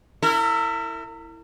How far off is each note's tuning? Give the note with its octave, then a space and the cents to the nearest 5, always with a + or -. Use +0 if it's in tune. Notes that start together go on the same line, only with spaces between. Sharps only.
E4 +0 A#4 -40